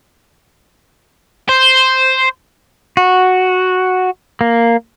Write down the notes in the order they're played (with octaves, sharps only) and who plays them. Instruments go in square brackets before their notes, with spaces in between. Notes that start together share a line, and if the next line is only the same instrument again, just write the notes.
[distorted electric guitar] C5
[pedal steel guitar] F#4
A#3